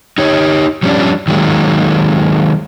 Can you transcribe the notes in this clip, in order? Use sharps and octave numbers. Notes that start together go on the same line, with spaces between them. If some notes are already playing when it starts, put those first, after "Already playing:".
D#4 G4 C#5
F3 G3 C#4 D4
D#3 F#3 G#3 A#3